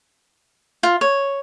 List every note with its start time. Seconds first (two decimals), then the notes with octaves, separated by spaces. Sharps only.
0.83 F4
1.01 C#5